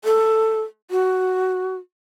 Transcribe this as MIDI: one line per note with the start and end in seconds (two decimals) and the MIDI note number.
0.05 0.62 69
0.91 1.75 66